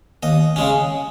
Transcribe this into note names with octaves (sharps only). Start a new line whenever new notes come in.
D#2 D#5
C#3 G#3 C#4